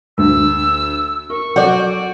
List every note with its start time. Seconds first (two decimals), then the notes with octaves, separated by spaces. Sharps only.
0.18 D2 E6
1.30 A#4 C#6
1.56 F#3 F#4 A4 D5 G6